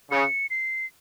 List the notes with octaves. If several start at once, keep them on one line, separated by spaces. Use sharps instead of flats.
C#3 C#7
C7